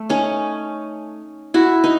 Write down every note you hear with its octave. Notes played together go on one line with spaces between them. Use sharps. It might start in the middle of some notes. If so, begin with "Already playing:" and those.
Already playing: A3
C#4 D#4
E4 F#4
D#4